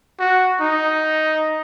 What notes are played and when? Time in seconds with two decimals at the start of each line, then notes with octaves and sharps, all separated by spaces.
0.19 F#4
0.61 D#4